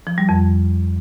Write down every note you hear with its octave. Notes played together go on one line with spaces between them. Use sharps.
F3
G3
F2